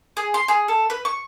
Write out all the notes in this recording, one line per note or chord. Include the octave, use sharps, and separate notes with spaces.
G#4
C6
G#4
A4
B4
C#6